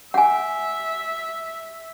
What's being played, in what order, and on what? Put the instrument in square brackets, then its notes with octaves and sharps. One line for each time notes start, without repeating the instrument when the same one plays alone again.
[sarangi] E5 [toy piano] F#5 G#5